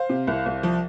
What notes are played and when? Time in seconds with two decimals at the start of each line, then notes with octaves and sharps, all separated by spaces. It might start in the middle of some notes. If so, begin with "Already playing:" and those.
Already playing: C5 F5
0.09 C3
0.27 C2
0.46 C2
0.63 F3